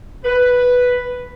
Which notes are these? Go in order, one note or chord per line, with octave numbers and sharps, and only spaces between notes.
B4